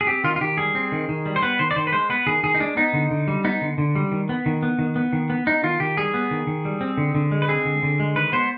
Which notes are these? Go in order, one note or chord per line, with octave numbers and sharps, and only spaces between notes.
G#4
C4 G4
D#3 F4
F4
D#3 G4
G3 G#4
C4
D#3
D#3
G3
C5
B3 B4
D#3 C5
D5
D#3 C5
B4
G#3 C5
B3 B4
D#3 G#4
D#3 G#4
D#4
G#3 D4
B3 D#4
D3
D3
G3
B3 D#4
D3
D3
G3
D#3
B3
D#3
B3
D#3
B3
D#3
B3
B3 D#4
D#3 F4
D#3 G4
G3 G#4
B3
D#3
D#3
G3
C4
D3
D3
G#3
B4
C4 G#4
D3
D3
G#3
D#3 B4
B3 C5